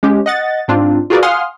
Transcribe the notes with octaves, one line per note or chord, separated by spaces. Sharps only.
G#3 C#4 G4
D#5 F#5 A6
G#2 C4 D4 F4
F4 F#4 G#4 A#4 B4 D5
F5 F#5 G#5 C6 D#6 F6